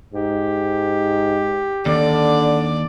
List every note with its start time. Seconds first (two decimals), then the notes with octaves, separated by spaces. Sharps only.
0.14 G#2 G4
1.86 D#2 D3 D5